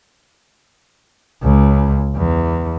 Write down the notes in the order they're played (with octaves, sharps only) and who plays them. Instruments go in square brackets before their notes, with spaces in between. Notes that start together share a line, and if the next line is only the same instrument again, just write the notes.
[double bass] C#2
E2